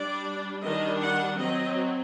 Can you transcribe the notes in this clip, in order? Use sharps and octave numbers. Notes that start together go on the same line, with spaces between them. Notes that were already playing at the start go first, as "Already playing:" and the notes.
Already playing: G3 D4 D5
D#3 G3 D4 D#5
F#5
F#3 C4 D#5